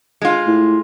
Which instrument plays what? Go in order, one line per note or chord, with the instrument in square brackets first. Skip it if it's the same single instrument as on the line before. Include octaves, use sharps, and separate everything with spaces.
[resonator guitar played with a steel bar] G#3 F4
[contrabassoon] A2